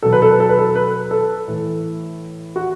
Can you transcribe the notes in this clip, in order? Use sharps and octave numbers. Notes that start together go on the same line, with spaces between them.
B2 F#3 A4
B4
A4
B4
A4
B4
A4
B4
A4
A2 E3
F#4